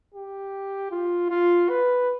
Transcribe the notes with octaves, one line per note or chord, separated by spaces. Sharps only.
G4
F4
F4
B4